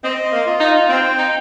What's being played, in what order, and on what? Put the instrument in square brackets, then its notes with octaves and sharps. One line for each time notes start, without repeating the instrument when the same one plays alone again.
[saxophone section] C4 [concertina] D#5
[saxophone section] A#3
[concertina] F4
[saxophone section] D#4
[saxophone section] C4 [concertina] G5
[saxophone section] D#4